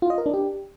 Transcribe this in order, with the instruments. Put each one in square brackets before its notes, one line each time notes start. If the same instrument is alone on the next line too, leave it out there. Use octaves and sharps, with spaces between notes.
[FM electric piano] F4
D#5
A#4
D4
G4